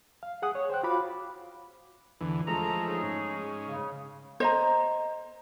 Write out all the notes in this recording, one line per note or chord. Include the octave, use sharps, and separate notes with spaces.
F5
G#4 F#5 D#6
C#5
C5 G5 F#6
F4 F#4 F5 B5 D6
E2 D3 E3
F3 G#3 A3 A4 A5 A#5
C#3 D#4 G#4
G#2 C#4
C#3
C5 D#5 A#5